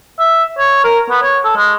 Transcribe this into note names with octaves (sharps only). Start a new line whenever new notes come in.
E5
C#5
A#4
B3
C#5
A4
G#3